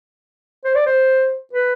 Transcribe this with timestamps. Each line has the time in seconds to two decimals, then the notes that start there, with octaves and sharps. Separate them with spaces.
0.64 C5
0.75 D5
0.86 C5
1.53 B4